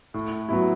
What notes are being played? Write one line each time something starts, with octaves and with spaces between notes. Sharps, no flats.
A2
F#3 B3 E4